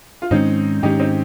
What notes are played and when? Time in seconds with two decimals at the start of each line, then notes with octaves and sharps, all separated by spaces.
0.22 F4
0.31 G#2 D#3 G#3 C4 C#4 D#4
0.83 G#2 D#3 G#3 C#4 D#4 G4
1.00 C4 D#4